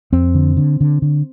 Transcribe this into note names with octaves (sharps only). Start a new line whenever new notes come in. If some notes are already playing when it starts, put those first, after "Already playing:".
F2 C4
D3
D3
D3
D3